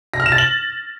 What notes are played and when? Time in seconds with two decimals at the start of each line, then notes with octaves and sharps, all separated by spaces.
0.14 A#6
0.20 F6
0.26 E7
0.32 A6
0.38 F#7